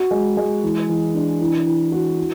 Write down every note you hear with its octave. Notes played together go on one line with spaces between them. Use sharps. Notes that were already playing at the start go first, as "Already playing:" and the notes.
Already playing: F#4
G#3
G#3
E3
E3
D4
E3
E3
F#4
E4